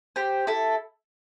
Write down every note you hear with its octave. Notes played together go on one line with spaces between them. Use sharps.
G4 C5
E4 A4